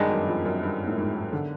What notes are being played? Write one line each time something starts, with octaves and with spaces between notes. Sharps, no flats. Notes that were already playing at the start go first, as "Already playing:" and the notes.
Already playing: G2 D#3 G#3 B3 D4
F#2
F2
F#2
G2
A2
G#2
D3